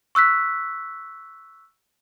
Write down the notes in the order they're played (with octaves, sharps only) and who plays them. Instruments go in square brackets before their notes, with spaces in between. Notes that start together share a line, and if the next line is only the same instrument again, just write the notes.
[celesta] C#6 E6 F#6 B6